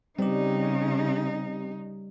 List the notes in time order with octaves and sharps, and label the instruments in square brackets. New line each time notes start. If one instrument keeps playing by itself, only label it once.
[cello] C#3 D#4 [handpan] G3 [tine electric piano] C4 G4